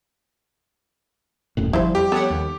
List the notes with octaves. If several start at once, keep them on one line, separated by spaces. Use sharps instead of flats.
D#1 F#2 A2
G1 F3 G3 E4 F4 C5
F2 G4
B3 A4 C#5 F#5
D#2